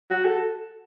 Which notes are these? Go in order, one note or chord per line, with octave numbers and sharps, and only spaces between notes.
F#4
A4